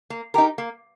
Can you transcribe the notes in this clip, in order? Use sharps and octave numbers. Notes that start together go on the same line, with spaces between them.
A#3
D#4 G4 A#4
A#3